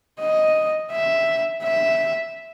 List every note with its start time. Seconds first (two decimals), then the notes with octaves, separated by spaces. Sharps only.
0.20 D#5
0.91 E5
1.63 E5